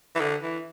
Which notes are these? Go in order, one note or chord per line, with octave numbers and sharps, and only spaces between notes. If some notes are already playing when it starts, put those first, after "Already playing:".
E3
D3
E3